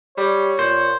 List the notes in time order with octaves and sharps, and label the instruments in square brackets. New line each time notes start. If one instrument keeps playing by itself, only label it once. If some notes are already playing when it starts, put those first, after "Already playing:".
[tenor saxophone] G3 [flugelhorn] C#5
[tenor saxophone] A#2 [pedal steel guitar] C5